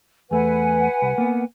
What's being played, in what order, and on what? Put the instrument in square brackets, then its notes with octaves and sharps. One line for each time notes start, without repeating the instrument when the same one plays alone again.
[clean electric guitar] E2 A3 [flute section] B4 F#5 G#5
[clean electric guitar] C2
A#3 B3